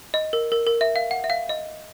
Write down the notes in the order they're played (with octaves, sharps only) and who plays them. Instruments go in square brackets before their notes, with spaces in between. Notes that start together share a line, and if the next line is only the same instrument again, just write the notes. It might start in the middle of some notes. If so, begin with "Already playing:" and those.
[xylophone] D#5
A#4
A#4
A#4
E5
F5
F#5
E5
F5
D#5